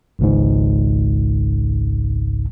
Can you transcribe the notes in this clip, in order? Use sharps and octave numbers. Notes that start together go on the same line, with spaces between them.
G#1 C#2 G#2